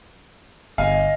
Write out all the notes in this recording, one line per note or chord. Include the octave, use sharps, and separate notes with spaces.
G1 D#5 F5 G#5